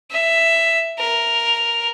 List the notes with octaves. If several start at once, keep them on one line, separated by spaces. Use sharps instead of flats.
E5
A#4